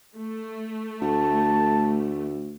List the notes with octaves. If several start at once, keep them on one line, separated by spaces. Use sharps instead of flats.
A3
D2 A5